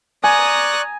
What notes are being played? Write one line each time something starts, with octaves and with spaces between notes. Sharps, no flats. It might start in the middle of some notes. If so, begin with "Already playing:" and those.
D5 G#5 A#5 C#6 D#6 F#6